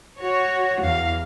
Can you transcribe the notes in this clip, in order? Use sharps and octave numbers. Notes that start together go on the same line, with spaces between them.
F#4 C#5
E2 F5